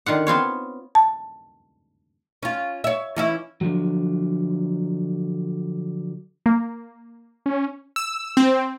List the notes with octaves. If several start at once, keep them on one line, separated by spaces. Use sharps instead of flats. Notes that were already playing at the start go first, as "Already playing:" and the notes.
D3 D#3 F4 F#5
B3 C4 F4 C#5
A5
C#4 F4
C#5 E5
E3 C#4 E4
D3 F3 F#3
A#3
C#4
E6
C4